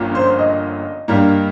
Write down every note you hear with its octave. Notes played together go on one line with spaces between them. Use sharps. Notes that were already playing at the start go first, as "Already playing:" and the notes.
Already playing: G1 G2 F3 A#3 C#4
C5
D#5
G2 G3 A#3